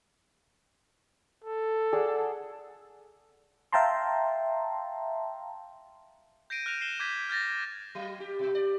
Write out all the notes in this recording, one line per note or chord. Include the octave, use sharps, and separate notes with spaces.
A4
G#4 D5 F#5
E5 F5 G5 A5 A#5 C6
G6 A#6 C7 D7 D#7
F6 F#6 A#6 D7 E7 F7
C7 E7 G7
D6 G6 G#6 B6 D7
F6 G6 A6 A#6
F#3
G4
B2
D5